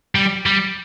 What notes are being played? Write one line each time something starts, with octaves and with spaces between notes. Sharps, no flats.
G3
G3